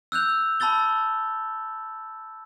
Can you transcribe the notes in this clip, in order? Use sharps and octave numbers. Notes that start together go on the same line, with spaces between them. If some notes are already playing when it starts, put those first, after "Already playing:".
E6 F#6 G6 F7
A5 B5 E6 A6 G7